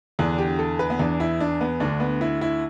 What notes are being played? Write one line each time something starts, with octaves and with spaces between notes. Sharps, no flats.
E2 D3 D4
G4
A4
B4
B3
E2 E3 D4
E4
D4
B3
D2 D3 D4
B3
E4
E4